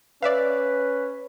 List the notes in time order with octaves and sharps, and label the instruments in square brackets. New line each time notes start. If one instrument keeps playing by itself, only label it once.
[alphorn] C#4 [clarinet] B4 [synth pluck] D5 E5 F5